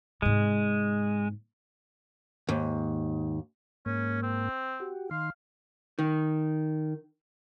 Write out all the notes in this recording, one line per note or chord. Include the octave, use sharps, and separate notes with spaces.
G#2 C3 G#3
D#2 G#2
G#2 A#3 C#4
C4
F#4 G4
D#3 F5 C6
D#3